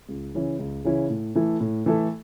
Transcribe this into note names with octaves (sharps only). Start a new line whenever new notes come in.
C#2
C#3 E3 C#4 E4
C#2
C#3 E3 C#4 E4
A2
E3 A3 E4 A4
A2
E3 A3 E4 A4